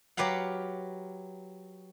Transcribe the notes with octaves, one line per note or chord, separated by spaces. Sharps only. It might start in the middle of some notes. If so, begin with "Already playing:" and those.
F#3 G4 B4 F5 F#5